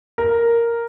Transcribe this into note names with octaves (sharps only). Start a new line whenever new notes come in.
A#4